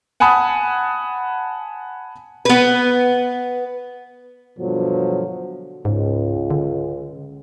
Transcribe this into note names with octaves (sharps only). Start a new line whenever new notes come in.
F#5 G#5 A5 B5 D#6
B3 B4
G2 B2 D3 F3 F#3
C#2 G#2
D3